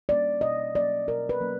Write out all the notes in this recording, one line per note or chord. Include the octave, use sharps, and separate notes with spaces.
G3 A#3 C#4 D5
B2 D#5
F#3 A#3 C#4 D5
B2 A#4
B4
F#3 A#3 C#4